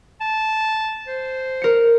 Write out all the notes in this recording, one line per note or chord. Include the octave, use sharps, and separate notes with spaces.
A5
C5
A#4 C#7